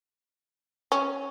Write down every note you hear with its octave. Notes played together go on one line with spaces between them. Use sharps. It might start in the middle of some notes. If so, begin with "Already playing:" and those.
C#4